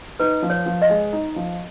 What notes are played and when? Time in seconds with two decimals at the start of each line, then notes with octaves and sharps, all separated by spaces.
0.20 D#4 B4
0.42 F3
0.50 C#5
0.66 F3
0.82 D#5
0.89 G#3
1.13 D#4
1.36 F3